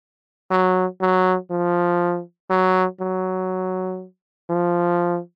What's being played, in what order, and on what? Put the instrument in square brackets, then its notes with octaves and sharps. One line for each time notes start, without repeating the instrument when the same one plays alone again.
[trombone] F#3
F#3
F3
F#3
F#3
F3